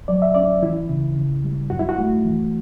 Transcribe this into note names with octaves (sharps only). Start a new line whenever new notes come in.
F#3 D5
E5
C#4 D5
E3 E4
C#3
C#3
G3
F#2 F#4
E4
F#4
A3
E3